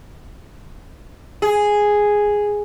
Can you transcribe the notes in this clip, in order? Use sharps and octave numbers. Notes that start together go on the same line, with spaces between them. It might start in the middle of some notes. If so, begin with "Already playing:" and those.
G#4